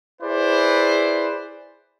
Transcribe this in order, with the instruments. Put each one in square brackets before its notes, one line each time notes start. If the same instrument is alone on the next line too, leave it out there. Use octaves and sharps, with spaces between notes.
[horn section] E4 G#4 B4 C5 D5